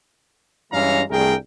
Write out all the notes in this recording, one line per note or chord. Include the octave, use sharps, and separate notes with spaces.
G2 E3 G#3 C#4 F5 A#5
C2 G2 A3 G#4 A#4 G5